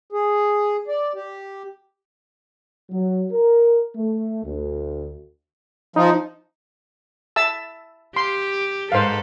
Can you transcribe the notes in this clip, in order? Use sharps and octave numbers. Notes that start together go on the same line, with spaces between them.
G#4
D5
G4
F#3
A#4
A3
D2
F3 D#4
E5 A5 E6
G4 C6
G#2 A4 B4 C5 F5